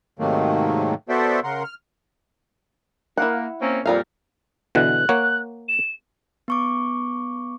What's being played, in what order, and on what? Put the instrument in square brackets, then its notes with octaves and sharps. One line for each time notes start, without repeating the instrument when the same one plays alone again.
[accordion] G#2 C3 D#3 F#3 A3 A#3
B3 F#4 A4 C5 D5 E5
C#3 A#4 F#5 C6
F6
[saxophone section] A#3 [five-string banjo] E4 F#5
[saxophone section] A#3 C4 C#4
[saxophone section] F2 A#2 [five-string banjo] G3 A#4 F5
[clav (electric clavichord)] B2 D3 E3 [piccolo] F#6
[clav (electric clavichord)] A#3 C#5 F#5
[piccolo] E7
[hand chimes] B3 C#6 D6